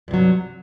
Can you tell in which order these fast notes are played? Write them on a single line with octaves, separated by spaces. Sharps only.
G2 C3 F#3